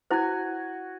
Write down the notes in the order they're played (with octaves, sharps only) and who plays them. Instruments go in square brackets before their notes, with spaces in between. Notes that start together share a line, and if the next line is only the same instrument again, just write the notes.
[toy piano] E4 C5 [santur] F#4 G#5